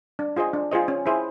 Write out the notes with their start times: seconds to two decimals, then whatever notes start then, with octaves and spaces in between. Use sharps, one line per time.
0.19 D4
0.36 F4 G#4 C5 D#5
0.53 D4
0.72 F4 G#4 C5 D#5
0.88 C#4
1.06 E4 G#4 C5 E5